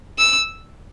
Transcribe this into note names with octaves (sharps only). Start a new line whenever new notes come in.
E6